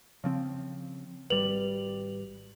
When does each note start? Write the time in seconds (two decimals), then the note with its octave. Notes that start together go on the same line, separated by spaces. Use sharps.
0.24 C#3 F3 C4
1.30 G#1 G3 B4 F7 F#7